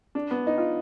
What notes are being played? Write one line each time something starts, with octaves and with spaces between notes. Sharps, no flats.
D4
B3
D#4
F4